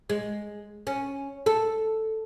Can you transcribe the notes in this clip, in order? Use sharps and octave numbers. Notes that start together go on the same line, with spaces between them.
G#3
C#4
A4